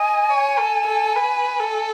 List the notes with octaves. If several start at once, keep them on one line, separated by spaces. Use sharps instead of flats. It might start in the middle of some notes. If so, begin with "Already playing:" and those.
Already playing: D#5 G#5
C#5
A4
A4
B4
A4